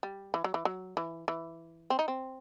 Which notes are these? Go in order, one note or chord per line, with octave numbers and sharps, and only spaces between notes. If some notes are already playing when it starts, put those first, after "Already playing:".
G3
E3
F#3
E3
F#3
E3
E3
C4
D#4
C4